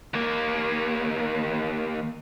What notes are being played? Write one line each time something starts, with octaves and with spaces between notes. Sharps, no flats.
D#2 A#3